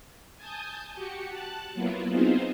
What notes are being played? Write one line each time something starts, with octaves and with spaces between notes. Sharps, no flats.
G#5 A5 D#6 G6
F#4 G4 C#7
A5 F#6
F#3 A#3 B3 E4 F4
B3 C4 D#4 F4 G#4 C5